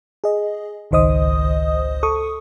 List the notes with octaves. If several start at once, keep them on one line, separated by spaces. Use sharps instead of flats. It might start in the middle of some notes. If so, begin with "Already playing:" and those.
G#4 D#5
G#1 C#2 D#3 C5 D#5 D#6
A4 C#6 D#6